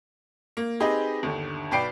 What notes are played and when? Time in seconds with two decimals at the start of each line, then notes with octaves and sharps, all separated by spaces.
0.57 A#3
0.80 C4 D#4 G4 G#4 B4 D#5
1.23 G1 D#2 D3
1.71 B1 B4 D5 G5 C7 D7